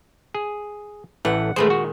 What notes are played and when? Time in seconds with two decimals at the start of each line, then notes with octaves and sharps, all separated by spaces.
0.35 G#4
1.25 A1 E3 A3 F#5
1.56 A#2 D#3 G#3 A3 B4 C5
1.70 F#4